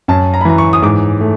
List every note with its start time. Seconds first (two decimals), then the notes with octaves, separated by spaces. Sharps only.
0.08 F#2 A5
0.34 A#5
0.41 B5
0.45 E3 A#5
0.58 C#6
0.73 D#6
0.83 G#2 D6
1.21 A3